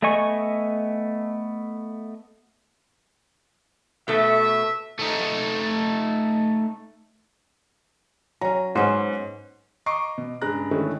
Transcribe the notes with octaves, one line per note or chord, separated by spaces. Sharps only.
A3 B3 D#5 G#5 C#6
B2 A3 E5
A3 D#4
F#3 C#4 A#5
G#2 B3 C#4 C5
D#5 A#5 C#6 D6 C7 D7
B2
G2 C#3 G#3 A#5 F#6 A#6
D3 D#3 G#3 A3 C#4 E4